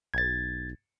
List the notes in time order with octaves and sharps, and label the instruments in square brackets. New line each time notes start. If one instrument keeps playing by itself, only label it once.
[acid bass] B1 [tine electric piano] G#6 A6